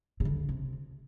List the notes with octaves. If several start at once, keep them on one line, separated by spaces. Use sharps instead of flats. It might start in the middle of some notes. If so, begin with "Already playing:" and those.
C3
D3
C3